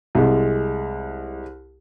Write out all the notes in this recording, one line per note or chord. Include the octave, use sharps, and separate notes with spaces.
C2 G#3